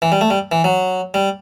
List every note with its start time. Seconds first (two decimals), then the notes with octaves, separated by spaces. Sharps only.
0.02 E3
0.12 G3
0.21 A3
0.30 G3
0.52 E3
0.64 F#3
1.14 G3